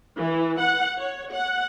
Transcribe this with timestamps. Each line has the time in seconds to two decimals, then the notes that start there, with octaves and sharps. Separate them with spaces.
0.17 E3
0.59 F#5
0.99 C#5
1.34 F#5